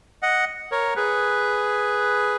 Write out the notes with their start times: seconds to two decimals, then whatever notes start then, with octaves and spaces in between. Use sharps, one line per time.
0.22 D#5 F#5
0.72 A#4 C#5
0.96 G#4 B4